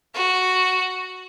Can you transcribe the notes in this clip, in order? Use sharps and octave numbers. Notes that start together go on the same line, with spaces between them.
F#4